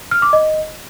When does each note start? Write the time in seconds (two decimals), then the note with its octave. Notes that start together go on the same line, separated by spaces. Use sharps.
0.11 F6
0.22 D6
0.33 D#5